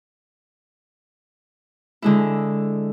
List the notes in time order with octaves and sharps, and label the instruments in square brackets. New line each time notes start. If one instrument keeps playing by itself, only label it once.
[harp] D3 G#3 E4